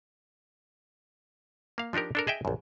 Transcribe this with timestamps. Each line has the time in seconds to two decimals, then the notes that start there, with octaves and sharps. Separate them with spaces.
1.78 A#3 F5
1.93 F3 D4 D#4 G4 A#4
2.15 D4 A4 A#4
2.27 G#4 D#5 E5 G5
2.45 A#1 F#2